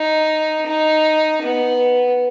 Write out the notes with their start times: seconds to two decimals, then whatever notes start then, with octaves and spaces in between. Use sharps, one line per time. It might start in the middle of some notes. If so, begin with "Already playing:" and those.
Already playing: D#4
0.66 D#4
1.42 B3